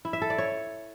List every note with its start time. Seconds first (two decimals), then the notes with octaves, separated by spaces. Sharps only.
0.05 E4
0.13 E5
0.22 A4
0.30 D5
0.38 C#5